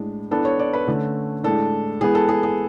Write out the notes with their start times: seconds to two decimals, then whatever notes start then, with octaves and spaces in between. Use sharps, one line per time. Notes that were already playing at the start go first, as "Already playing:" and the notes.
Already playing: A2 G#3 D4
0.31 E3 B3 D4 A4
0.45 C#5
0.59 D5
0.73 B4
0.87 D3 A3 C#4
1.44 A2 G#3 D4 A4
2.01 E3 G#3 B3 G#4
2.15 A4
2.29 G#4
2.43 G#4